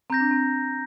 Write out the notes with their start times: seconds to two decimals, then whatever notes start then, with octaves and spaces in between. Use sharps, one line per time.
0.10 C4 A#5 G6 A#6
0.20 D4
0.31 C4